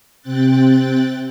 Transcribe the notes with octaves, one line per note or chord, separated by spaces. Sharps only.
C3 C4 G5 F#6 A6